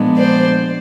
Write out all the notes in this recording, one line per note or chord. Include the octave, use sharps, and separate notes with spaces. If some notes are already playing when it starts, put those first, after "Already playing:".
Already playing: A#2 F3 G#3 B3 D4
C5 D5